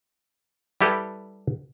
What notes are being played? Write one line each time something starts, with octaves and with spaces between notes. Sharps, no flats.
G3 E4 G4 A4 B4